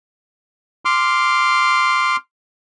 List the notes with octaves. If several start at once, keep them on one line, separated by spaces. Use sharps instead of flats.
C6 D6 F6